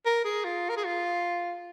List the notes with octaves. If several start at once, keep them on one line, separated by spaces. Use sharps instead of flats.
A#4
G#4
F4
A#4
G#4
F4